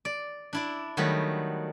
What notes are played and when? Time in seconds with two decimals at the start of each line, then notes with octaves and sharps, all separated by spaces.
0.05 D5
0.53 D4 E4 D5
0.97 D#3 F#3 G3 A3 B3